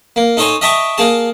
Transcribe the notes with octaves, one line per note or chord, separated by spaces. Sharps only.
A#3
D#4 A4 C5 C#5 G#5 A#5
D#5 E5 G5 A5 A#5 C#6
A#3 G#4 A5